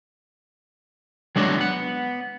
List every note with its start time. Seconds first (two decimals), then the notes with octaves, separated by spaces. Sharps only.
1.36 F#3 G#3 D4 F#4
1.58 B3 F#5